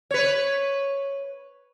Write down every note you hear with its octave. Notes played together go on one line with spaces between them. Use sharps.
B4 C#5